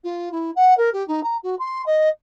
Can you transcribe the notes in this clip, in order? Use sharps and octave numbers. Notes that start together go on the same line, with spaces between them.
F4
E4
F#5
A#4
G4
D#4
A#5
F#4
C6
D#5